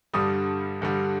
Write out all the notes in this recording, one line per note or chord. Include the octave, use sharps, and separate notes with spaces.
G2 D3 G3 D#6
G2 D3 G3